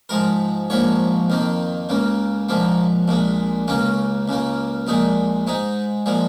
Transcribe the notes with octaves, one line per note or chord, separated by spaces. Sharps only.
G#2 F3 G#3 A#4
A#1 G#2 F3 A#3 C#5
F2 D#3 A#3
C#2 C#3 A#3
A#1 G#2 F3 A#3
A#1 A#2 G#3
C#2 C#3 A#3 C#4
C#2 C#3 A#3
A#1 A#2 G#3 D#4
G#2 G#3 D#4
A#2 F3 G#3